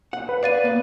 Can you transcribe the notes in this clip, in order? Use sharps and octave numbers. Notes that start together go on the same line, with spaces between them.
F#5
B4
D5 F5 A6 D#7
A#3 B3